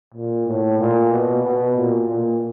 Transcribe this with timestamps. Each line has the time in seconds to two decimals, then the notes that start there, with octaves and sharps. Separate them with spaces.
0.15 A#2
0.47 A2
0.79 A#2
1.11 B2
1.43 B2
1.76 A#2
2.08 A#2